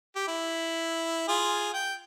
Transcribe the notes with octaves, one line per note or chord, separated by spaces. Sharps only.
G4
E4
F4 G#4
G5